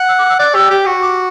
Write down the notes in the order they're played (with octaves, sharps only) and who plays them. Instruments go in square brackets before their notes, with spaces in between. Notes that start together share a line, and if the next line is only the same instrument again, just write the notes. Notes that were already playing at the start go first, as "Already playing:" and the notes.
Already playing: [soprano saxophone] F#5
[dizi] E6
D6
E6
[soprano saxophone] D5 [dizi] F#6
[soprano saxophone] G4 [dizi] E6
[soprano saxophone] G4
F#4
[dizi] D6